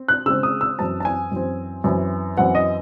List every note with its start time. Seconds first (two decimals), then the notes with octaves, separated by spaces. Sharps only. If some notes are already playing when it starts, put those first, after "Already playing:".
Already playing: C4
0.08 F#6
0.26 C#3 G#3 C4 E6
0.43 D#6
0.61 E6
0.79 F#2 E3 C4 A5
1.00 A5
1.05 G#5
1.32 F#2 E3 C4
1.84 F#2 E3 C4
2.37 F#2 E3 C4 F#5
2.55 D#5